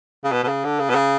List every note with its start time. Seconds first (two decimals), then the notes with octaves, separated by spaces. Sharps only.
0.24 C#3
0.32 B2
0.43 B2
0.48 C#3
0.64 D3
0.79 C#3
0.89 B2
0.94 C#3